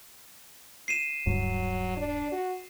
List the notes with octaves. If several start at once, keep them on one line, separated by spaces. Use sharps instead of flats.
C7 D#7 E7
D1 G2 F#3
D4
F#4